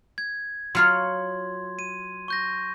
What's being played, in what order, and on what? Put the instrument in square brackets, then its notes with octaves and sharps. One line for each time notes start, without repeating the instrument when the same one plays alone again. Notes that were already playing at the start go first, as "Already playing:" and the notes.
[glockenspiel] G#6
[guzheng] F#3 F4 C#5 [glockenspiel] C6
[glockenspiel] D#7
C#6 G6 A#6